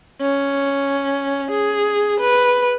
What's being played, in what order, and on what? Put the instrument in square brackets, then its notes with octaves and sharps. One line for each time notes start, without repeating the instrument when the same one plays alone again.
[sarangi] C#4
G#4
B4